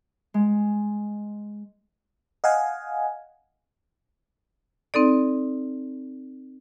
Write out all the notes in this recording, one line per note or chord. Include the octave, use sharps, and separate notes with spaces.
G#3
D#5 F5 F#5 G#5
C4 D#4 A4 D5